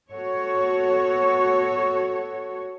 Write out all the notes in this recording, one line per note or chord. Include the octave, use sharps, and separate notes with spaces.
B3 F#4 A4 C#5